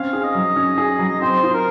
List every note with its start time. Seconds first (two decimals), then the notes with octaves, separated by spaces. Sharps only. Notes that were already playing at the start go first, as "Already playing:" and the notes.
Already playing: C4 C#4 F5
0.13 G#4
0.24 D#5
0.35 F#3
0.56 C#4
0.78 G#4
0.99 F#3
1.21 C4 C5
1.43 F4
1.53 A#4